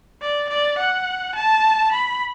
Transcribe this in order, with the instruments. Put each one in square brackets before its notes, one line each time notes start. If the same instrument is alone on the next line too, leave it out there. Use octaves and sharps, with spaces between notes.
[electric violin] D5
D5
F#5
A5
B5